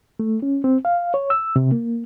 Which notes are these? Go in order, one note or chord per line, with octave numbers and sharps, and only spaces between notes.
A3
C#4
C4
F5
C#5
E6
C3
A#3